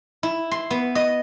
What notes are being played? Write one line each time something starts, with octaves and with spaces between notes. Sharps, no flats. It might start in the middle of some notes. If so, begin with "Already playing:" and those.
E4
C6
B3
D#5